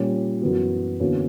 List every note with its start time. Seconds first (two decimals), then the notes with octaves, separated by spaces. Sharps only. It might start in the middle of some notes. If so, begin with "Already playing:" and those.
Already playing: A#2 G3 C#4
0.42 F#2 E3 B3 F#4
1.00 E2 D3 A#3 C#4 F#4